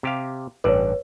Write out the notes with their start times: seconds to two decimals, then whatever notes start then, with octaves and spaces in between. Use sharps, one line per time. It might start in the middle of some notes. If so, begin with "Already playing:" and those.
0.03 C3 G4 F5
0.64 A1 G2 B4 C#5 D5